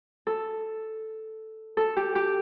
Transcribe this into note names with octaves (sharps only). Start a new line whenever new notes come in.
A4
A4
G4
G4